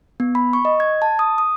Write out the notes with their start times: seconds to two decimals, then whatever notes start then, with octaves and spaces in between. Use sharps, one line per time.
0.20 B3
0.35 B5
0.53 C#6
0.65 D#5
0.80 G#6
1.02 A5
1.19 D#6
1.38 D#6